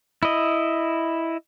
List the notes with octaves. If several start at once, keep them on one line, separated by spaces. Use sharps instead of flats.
E4 D#5